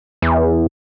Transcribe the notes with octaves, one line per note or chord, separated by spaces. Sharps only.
E2